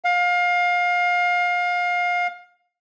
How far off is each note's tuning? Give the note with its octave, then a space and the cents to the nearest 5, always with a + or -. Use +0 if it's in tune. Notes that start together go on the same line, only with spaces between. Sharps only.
F5 +25